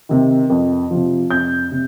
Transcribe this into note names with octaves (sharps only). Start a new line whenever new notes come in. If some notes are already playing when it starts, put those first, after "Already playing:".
C3 D#3
F2
C3 F3
F2 G6
C3